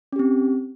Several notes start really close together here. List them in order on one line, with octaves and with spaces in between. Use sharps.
C#4 G4 C4